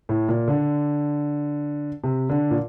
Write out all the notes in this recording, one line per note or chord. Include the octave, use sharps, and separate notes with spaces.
A2
A#2
D3
C3
D3
A#2